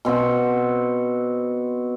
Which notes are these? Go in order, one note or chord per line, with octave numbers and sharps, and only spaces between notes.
B2 C4 C5 F#5